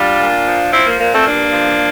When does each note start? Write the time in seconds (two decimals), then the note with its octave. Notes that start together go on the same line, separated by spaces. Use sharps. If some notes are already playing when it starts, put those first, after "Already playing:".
Already playing: G3 D4 F4
0.20 A#2
0.46 F3
0.72 F3 C4 E4
0.86 A#3
0.99 A#2 A#3
1.12 A3 C4
1.25 G2 A#3 D4
1.52 F3